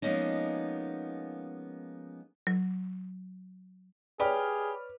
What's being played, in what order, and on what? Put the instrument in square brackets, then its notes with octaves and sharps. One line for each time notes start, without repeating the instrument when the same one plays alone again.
[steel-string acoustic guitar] F3 G#3 A#3 B3 C#4 D#4
[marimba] F#3
[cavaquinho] G4 [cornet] G#4 [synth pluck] B4 B5 F6 [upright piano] C#5 D5